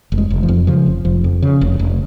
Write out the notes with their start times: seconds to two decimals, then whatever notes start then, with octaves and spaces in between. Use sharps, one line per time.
0.12 F1
0.18 G#3
0.30 F1
0.43 F3
0.48 F2
0.67 C#3 F3
0.86 F1
1.05 F1 F3
1.24 F2
1.42 C#3
1.61 F1
1.79 F1